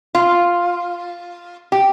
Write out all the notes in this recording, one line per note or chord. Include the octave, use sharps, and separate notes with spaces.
F4
G4